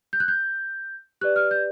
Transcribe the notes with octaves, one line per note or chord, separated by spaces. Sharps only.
G6
F#6
G6
G4 B4 D5 F#6
F6
G6